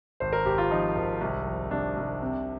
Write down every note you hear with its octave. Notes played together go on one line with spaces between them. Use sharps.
G#1 C5
A#4
G#1 G4
F4
F3 D#4
G#1
C2
F3
C2 D4
C2
C3